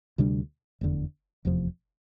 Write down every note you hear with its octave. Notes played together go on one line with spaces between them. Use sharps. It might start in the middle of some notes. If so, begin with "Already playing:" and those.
D2 C3 G3 D4
F1 E2 D3
F1 E2 C3 F3